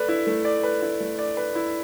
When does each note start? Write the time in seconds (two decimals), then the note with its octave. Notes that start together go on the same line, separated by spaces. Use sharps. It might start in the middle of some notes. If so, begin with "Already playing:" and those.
Already playing: A3 B4 D5
0.09 E4
0.27 A3
0.45 D5
0.63 B4
0.82 E4
1.00 A3
1.18 D5
1.37 B4
1.55 E4